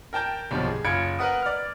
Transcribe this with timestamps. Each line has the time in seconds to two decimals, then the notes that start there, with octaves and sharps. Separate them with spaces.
0.13 A#4 G5 A5 G6
0.51 B1 G2 A#2 D3 F3
0.67 G#4
0.84 F#1 F4 B5 G#6 C#7 D7
1.19 A#4 B4 F#5 D#6
1.42 D5 F6